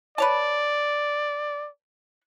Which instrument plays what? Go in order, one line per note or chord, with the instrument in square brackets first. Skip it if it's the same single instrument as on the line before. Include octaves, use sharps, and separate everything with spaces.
[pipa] B4 C#5 A5 [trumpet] D5